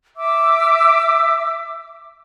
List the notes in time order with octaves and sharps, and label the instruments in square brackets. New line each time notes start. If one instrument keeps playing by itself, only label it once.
[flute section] E5 D6 E6